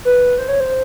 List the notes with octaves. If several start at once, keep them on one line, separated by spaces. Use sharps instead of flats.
B4
C5
C#5
C5